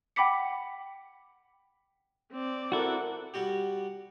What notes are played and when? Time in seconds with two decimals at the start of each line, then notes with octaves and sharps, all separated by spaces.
0.16 F#5 G5 B5 D6 B6 C#7
2.32 C4 D5
2.72 E4 F#4 A4 A#4 F#5
3.34 G3 F#4 G4